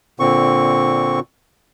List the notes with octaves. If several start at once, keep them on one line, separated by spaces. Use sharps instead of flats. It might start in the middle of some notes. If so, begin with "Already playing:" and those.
A#2 D3 C4 C#6